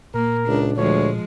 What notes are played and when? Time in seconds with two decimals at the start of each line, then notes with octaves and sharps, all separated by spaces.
0.14 A#2 A#3 A#4
0.48 C#2 D4
0.77 D2 F3 G#3 C#5